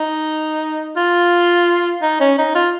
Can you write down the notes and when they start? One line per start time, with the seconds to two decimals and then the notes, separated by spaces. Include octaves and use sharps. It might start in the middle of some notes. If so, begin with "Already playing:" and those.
Already playing: D#4
0.97 F4
2.02 D#4
2.20 C#4
2.38 D#4
2.55 F4